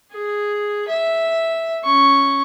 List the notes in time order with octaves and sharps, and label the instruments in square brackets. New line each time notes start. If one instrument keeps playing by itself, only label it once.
[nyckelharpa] G#4
E5
C#4 C#6